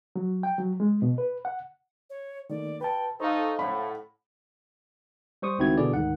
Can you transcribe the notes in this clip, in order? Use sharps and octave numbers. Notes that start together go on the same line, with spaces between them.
F#3
G5
F#3
G#3
B2
B4
F#5
C#5
D#3 A3 A#3 D5
B4 G5 A5
D#4 A4 C5 F5 C#6
A2 F#5 B5
G3 C5 C#6 D#6
C#2 D#3 C4 E4 F#4 G#6
B2 D3 E3 G#4 D5
D2 G#2 D#3 F#5